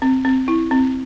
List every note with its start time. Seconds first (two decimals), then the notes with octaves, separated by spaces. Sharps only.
0.02 C4
0.25 C4
0.48 E4
0.71 C4